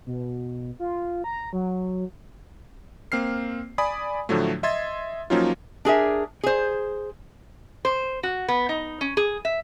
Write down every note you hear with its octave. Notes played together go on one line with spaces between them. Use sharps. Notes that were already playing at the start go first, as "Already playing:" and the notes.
B2
F4
A#5
F#3
A#3 C4 F6 C7
D5 G#5 B5 D#6
A2 D3 F3 F#3 A3
D#5 E5 C6 G#6 A6
F3 F#3 A#3 C#4 D#4 F4
D4 G#4 A#4 E5
G#4 C5
C5
F#4
B3
D#4
C#4
G#4
E5